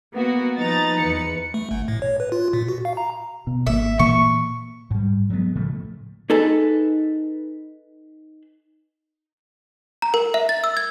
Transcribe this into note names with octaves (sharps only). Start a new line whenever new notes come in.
A#3 B3 F#4
F3 D#4 B4 A#5 A6
E2 B4 C#7
A3
G1
A2
C#5
B4
F4
A#2
F#4
F5
A#5
B2
G#1 A#3 E5
A#2 E3 A#3 C#6
G#2 G3
F#3 G#3 A3 B3
A2 C#3 F3 A3
D#4 G#4 A4 B4
A#5
A#4
E5
A6
E6
G#6